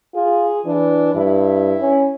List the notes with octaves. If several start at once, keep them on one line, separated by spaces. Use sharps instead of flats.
F4 G#4
E3 D4
G2 E4
C#4